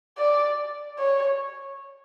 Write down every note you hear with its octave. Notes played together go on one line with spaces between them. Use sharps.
D5
C#5